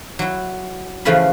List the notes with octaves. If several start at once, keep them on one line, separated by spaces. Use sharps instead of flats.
F#3 E4
C#3 E3 F3 A3 F4 B5